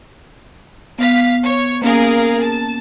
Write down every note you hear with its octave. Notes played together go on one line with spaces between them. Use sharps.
B3 F5 B6
C#5
A#3 C#4 G#4 A#4 F5
A5